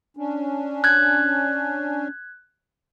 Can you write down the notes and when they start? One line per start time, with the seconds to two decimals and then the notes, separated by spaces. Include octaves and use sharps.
0.17 C#4 D4
0.84 F#6 G#6